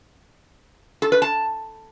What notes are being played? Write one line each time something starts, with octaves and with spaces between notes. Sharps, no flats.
A4
B4
A5